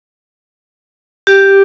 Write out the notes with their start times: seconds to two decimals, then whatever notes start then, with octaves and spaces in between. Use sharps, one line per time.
1.27 G4